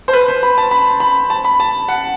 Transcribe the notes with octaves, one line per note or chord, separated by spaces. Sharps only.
C5
B4
C5
B5
A5
B5
B5
A5
B5
A5
F#5